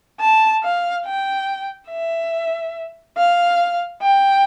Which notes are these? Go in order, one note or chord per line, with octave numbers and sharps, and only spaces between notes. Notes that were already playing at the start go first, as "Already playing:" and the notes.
A5
F5
G5
E5
F5
G5